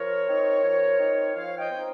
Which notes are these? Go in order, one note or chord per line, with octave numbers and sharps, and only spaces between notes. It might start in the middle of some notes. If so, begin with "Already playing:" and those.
Already playing: F3 A#4 C#5
C4 D#4
F3
C4 D#4
F3 C#5 F5
D#5 G5
C4 D#4